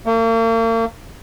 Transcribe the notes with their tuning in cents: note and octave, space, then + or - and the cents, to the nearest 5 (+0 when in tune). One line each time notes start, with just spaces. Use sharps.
A#3 -40